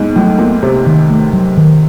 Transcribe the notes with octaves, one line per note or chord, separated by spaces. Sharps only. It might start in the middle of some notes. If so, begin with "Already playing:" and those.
Already playing: G#2 B3
A2 F#3
A#2 B3
C3 B3
D#3
A3
F#3
D#3